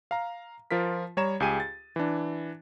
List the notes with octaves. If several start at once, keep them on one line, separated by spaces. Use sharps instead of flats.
F5 A#5
F3 F4 A#4 B6
G3 C#5 A#5 E7
C#2 G4 G#4 G#5 D#7
A6
E3 D4